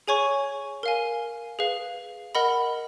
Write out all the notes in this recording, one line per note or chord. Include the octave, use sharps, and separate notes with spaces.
G#4 C#5 G#5 C#6
A#4 F5 G#5
G#4 B4 F5
A#4 D#5 F#5 B5